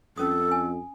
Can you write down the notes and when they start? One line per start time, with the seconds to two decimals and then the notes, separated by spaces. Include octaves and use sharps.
0.18 F2 C#4 A4 D#6
0.51 G#5